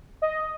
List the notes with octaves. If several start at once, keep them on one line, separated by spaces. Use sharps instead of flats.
D#5